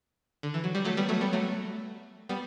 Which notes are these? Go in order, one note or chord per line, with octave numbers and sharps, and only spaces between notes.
D3
E3
F#3
G3
F#3 A3
G3 B3
F#3 A3
G3 B3
F#3 A3
G3 B3